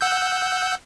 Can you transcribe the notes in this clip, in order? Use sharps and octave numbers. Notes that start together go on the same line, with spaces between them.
F#5 E6 G6